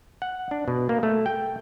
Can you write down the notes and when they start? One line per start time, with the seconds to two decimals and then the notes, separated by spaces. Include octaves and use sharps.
0.22 F#5
0.51 D4
0.68 B2
0.89 A#3
1.03 A3
1.26 G5